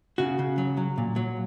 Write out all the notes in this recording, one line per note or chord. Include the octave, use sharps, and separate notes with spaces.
C#3 F#4
C#3
F#3
F#3
A#2
F#3